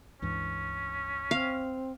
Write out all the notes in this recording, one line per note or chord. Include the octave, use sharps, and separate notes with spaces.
C#2 G2 E3 C#4
C4 F5